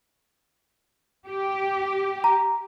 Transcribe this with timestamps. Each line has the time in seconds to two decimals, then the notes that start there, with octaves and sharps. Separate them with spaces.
1.27 G4
2.24 A#5